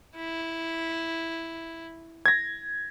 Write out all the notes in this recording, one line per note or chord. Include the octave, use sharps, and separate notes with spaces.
E4
G#6 A#6